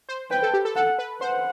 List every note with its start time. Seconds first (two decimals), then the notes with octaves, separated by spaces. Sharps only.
0.09 C5
0.31 B4 G5
0.42 A4
0.54 G4
0.65 A4
0.76 A4 F#5
0.98 B4
1.21 C5 F#5